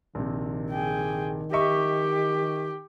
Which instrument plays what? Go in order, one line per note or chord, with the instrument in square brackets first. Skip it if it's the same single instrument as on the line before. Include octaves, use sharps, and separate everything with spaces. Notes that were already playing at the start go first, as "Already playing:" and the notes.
[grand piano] A#1 C3 [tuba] D#3
[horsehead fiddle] G#4 G5
[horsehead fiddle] G4 [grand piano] D#5 E5 C#6